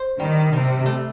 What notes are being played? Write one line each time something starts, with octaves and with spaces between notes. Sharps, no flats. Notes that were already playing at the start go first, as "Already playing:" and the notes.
Already playing: C5
D#3 G3
C3 G3
A3